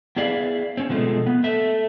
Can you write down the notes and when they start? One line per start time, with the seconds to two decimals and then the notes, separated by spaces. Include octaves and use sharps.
0.16 B3 E4 G#4 D5 E5 F5
0.77 C4 C#4
0.90 B2 F3 G#3 A3
1.26 B3
1.44 A3 E5